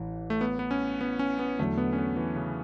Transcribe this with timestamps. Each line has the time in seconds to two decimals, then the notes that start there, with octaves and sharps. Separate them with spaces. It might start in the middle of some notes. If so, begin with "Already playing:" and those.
Already playing: A1 E3
0.30 A3
0.41 B3
0.59 B3
0.71 C#4
1.01 B3
1.19 C#4
1.39 B3
1.59 E2 D3 F#3 A3
1.77 B3
1.93 C#4
1.98 B3
2.17 E3
2.36 C#3